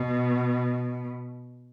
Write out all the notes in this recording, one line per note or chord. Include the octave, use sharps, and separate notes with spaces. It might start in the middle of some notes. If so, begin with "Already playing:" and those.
Already playing: B2